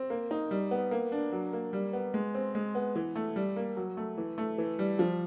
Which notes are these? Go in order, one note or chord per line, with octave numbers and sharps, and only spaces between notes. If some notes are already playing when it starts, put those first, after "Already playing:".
Already playing: C4
A#3
D#4
G3
B3
A#3
D4
F#3
A#3
G3
B3
G#3
C4
G#3
B3
E3
A3
G3
A#3
F#3
A3
E3
A3
E3
G3
F3